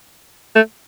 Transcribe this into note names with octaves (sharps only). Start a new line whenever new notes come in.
A3